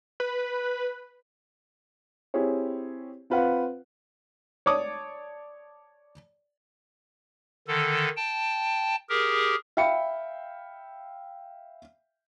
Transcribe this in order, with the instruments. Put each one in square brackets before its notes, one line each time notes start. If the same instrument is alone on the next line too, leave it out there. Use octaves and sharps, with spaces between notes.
[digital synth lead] B4
[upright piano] C4 E4 G4 G#4 C#5
C4 F4 B4 F5 F#5
[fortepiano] C#5 D5 A5 D6 D#6
[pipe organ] D3 D#3 A4
G5 A5
G4 G#4 A#4
[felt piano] E5 F5 G5 B5 C#7